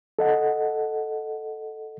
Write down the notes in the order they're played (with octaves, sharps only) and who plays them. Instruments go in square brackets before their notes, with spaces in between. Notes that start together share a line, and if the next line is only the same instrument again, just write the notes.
[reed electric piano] A4 D#5 F#5